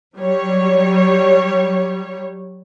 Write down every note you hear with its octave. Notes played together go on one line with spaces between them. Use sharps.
F#3 G3 C#5